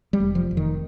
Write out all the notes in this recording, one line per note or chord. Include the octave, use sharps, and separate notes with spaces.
G3
F1
F3
F1
D#3